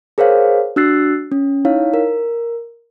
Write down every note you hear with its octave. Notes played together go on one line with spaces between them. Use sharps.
G#4 A#4 C5 C#5 F5
D4 F#4 E6 F#6 A6 C7
C#4
D#4 E4 C#5 F5
A#4